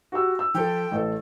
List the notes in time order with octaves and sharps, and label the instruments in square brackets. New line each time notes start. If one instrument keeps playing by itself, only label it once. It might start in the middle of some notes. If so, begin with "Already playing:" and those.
[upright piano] F#4 G4 E6
E6
[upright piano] F3 A4 [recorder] G5
[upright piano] A1 A4